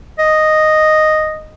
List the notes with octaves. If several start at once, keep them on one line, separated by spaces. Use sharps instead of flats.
D#5